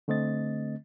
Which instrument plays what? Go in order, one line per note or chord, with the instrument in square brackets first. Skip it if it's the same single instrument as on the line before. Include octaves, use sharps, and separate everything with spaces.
[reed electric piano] D3 A3 C4 D#5 A6